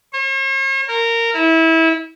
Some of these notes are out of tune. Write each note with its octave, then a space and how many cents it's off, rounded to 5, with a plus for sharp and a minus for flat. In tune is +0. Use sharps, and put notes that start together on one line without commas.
C#5 -45
A#4 -15
E4 -25